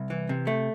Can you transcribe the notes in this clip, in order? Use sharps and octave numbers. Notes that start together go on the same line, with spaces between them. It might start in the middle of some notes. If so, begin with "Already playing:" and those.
Already playing: C2
E3
C3
A3